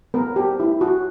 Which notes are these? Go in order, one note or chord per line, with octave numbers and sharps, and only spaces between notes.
B3 A#4
G4
E4
F#4